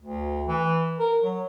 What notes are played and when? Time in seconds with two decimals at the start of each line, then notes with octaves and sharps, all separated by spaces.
0.01 D2
0.47 E3
0.99 A#4
1.23 F#3